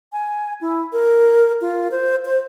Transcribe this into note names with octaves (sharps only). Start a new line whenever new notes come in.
G#5
E4
A#4
F4
C5
C5